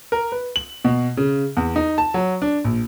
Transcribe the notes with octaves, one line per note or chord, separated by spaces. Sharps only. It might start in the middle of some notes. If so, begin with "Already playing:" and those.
A#4
B4
F#7
B2
C#3
E2
D#4
A5
F#3
D4
A#1